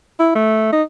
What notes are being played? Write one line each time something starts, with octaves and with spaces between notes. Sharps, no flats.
E4
A3
D#4